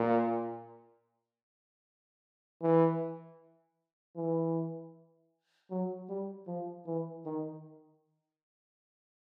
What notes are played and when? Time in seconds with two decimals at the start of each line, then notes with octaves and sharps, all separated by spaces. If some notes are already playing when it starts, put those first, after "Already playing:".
Already playing: A#2
2.62 E3
4.16 E3
5.70 F#3
6.09 G3
6.47 F3
6.86 E3
7.26 D#3